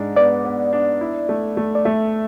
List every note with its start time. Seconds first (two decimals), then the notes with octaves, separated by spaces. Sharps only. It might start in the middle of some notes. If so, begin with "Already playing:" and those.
Already playing: G#2 G#3 D4
0.16 B3 D5
0.45 B3
0.73 D4
1.01 E4
1.29 A3
1.57 A3
1.75 D5
1.85 A3 E5